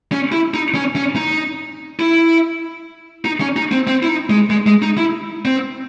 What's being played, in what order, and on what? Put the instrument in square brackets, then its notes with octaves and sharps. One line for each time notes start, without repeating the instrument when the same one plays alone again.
[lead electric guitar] C#4
E4
D#4
C#4
C#4
D#4
E4
D#4
C#4
D#4
C4
C4
E4
D#4
G#3
G#3
G#3
D#4
E4
C4